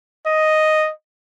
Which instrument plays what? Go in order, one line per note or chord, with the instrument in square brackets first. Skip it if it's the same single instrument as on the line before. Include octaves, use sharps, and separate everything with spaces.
[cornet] D#5